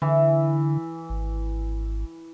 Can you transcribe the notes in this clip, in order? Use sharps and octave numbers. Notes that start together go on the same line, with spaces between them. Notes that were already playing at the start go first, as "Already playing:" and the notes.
D3 E3
G#1